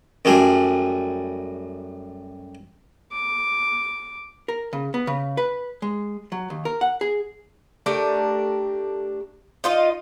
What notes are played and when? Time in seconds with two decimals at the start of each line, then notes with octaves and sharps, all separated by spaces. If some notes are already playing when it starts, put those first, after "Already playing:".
0.25 F#2 G3 A3 G#4
3.12 D6
4.48 A#4
4.73 C#3
4.94 B3
5.07 C#3
5.37 B4
5.82 G#3
6.32 F#3
6.50 D#2
6.65 A#4
6.81 F#5
7.01 G#4
7.86 A3 D4 G4 A#4
9.64 D#4 F4 D#5